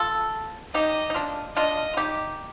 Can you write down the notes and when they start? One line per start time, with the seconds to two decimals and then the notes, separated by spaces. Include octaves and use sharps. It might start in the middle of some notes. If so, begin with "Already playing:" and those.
Already playing: F4 A4
0.74 D#4 G4 D#5
1.10 D#4
1.14 D4 F4
1.56 D4 F4 D#5
1.93 F4
1.97 D#4 G4